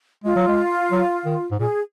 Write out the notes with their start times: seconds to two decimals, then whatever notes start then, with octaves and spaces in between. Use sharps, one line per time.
0.24 G#3 F4
0.36 F#3
0.48 G#3
0.92 F#3
1.26 D#3
1.51 G#2
1.60 A#2 G#4